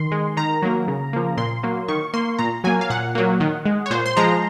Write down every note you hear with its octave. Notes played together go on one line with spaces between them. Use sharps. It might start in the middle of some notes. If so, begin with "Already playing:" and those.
Already playing: D#3 C6
G#3
D#3 A#5
F#3 A#3
C#3
F3 A#3
A#2 C6
F#3 A#3
D#3 C#6
A#3 C6
A#2 A#5
F#3 A#3 G#5
F5
A#2 F#5
F#3 A#3
D#3
G#3
C#5
A#2 C5
C6
F3 G#3 A#5